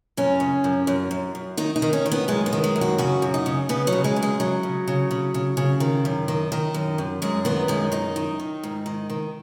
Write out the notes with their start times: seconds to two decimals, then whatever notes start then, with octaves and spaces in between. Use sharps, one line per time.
0.17 F#2 C#4
0.40 C#3
0.64 F#2
0.87 F#2
1.11 F#2
1.35 F#2
1.57 D#3 D#4
1.76 D#4
1.82 D#3
1.93 C#4
2.06 D#3
2.12 B3
2.28 F#2 G#3
2.46 B3
2.53 D#3
2.64 G#3
2.76 F#2
2.81 F#4
2.98 C#3 F#4
3.22 F#2
3.34 D#4
3.46 C#3
3.69 C#3 B3
3.87 F#3
3.93 C#3
4.04 G#3
4.16 F#2
4.23 G#3
4.40 C#3 F#3
4.63 C#3
4.88 C#3
5.11 C#3
5.34 C#3
5.57 C#3
5.80 D#3
6.05 F#2
6.28 D#3
6.52 D#3
6.74 F#2
6.98 F#2
7.22 F#2 G#3
7.45 D#3 B3
7.68 F#2 G#3
7.92 D#3 D#4
8.16 D#3
8.40 D#3
8.63 G#2
8.86 D#3
9.10 D#3